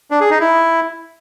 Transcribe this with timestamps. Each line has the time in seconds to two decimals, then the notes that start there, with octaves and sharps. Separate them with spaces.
0.11 D4
0.21 G#4
0.30 D#4
0.40 E4